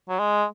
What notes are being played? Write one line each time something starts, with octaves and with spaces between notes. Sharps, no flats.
F#3
G#3